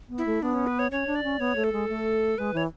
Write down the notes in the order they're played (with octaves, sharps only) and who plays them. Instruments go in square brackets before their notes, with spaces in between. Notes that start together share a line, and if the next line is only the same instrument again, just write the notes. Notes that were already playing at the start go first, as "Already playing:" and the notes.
[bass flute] B3
[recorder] E4
[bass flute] A3
[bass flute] B3 [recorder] D4
[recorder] C#4
B4
C#5
[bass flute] C#4 [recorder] C#5
[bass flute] D4
[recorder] D5
[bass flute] C#4
[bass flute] B3 [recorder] C#5
[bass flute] A3
[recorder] A4
[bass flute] G#3
A3
[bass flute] G#3 [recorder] B4
[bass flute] E3 [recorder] C#5